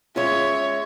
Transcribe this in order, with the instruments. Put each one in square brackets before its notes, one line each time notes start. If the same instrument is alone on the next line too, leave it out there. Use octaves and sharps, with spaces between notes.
[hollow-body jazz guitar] G#3 C#4 F4 [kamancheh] C#5 E5